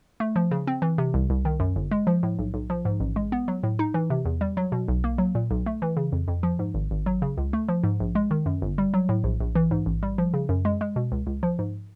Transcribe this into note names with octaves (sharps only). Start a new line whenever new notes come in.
A3
F3
C#3
C4
E3
C3
C2
C2
D#3
F#2
G1
G#3
F3
A2
B1
B1
F3
G#2
A1
G#3
B3
F#3
A2
D#4
E3
C3
E2
G3
F#3
B2
B1
A#3
F#3
A#2
B1
A3
E3
C#3
F2
F2
F3
G#2
G#1
G#1
F#3
C#3
C#2
A3
F3
G#2
A#1
G#3
D#3
F#2
G1
G3
F#3
A2
A#1
A#1
E3
G#2
A1
G3
F3
C#3
F#2
G#3
G#3
B2
C#2
C#2
F3
G#2